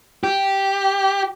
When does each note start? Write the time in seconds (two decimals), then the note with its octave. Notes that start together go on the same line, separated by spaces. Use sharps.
0.24 G4